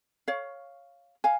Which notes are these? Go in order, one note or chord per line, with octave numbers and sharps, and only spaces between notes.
C#5 F5
F5 G#5